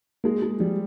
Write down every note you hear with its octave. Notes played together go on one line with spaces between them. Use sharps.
G#3 A#3
G#3
F3 G3